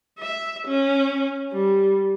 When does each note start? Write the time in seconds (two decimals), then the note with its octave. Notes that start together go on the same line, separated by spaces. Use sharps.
0.19 E5
0.68 C#4
1.53 G3